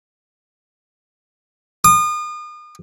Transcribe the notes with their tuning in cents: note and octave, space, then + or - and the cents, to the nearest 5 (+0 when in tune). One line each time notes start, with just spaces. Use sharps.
D#6 -40